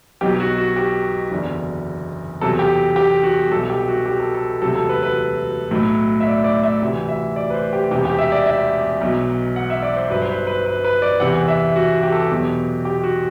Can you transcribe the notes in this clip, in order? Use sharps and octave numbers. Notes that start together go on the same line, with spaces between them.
B1 B2 F#3 G4
F#4
F#4
G4
F#1 E2 D3
E2 C3 F#3 A4
G4
G4
F#4
C2 B2 F#3 A4
G4
F#4
G4
A4
A4
E1 D2 C3 F#3 A4
A4
B4
B4
B1 A2 F#3
E5
D5
D5
E5
D2 C3 E3
E5
D5
B4
C5
G4
E1 E2 C3 G4
G4
E5
D5
E5
B1 B2 F#3
F#5
E5
D5
C5
G1 G2 F#3 B4
C5
B4
B4
B4
B4
D5
E2 C3 E3 F#5
E5
F#4
G4
A4
G4
E2 B2 F#3
G4
F#4